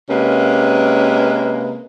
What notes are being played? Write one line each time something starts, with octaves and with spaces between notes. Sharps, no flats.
C3 G#3 A#3 C#4 B4